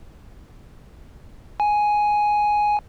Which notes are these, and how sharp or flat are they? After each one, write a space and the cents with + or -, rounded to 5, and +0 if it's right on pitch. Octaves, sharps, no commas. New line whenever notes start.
G#5 +5